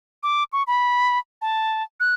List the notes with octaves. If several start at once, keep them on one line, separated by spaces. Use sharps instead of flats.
D6
C#6
B5
A5
F#6